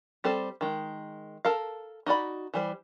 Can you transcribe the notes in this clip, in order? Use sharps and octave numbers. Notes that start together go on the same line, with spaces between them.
G3 C4 A4 C5
D#3 G#3
A4 A#4 F5
D#4 F#4 D5 B5
E3 G3 C5